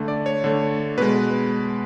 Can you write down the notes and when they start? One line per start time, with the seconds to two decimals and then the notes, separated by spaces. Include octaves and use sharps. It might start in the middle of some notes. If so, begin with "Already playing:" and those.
Already playing: D3 A3
0.08 D5
0.26 C#5
0.44 D3 A3
0.98 B2 G#3 B4